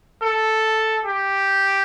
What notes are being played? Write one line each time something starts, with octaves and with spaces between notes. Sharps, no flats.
A4
G4